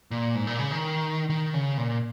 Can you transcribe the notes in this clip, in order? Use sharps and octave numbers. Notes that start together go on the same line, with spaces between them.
A#2
G#2
A#2
C#3
D#3
D#3
C#3
A#2